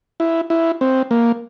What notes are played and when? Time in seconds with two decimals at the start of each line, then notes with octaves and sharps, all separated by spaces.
0.20 E4
0.50 E4
0.81 C4
1.11 A#3